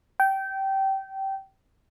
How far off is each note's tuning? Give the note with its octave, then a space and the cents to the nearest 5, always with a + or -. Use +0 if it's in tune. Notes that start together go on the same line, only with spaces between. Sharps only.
G5 -20